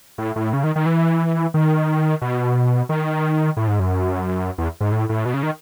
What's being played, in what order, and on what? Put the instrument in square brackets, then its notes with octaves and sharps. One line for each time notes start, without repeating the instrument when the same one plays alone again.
[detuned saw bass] A2
A2
C#3
D#3
D#3
E3
D#3
B2
D#3
A2
G#2
F#2
E2
G#2
A2
A2
B2
C#3
D#3